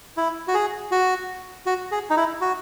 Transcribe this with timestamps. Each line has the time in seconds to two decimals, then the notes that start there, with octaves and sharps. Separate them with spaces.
0.17 E4
0.48 F#4
0.54 G#4
0.91 F#4
1.66 F#4
1.92 G#4
2.10 D#4
2.17 E4
2.41 F#4